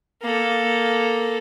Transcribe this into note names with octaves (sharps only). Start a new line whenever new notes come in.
A#3 A4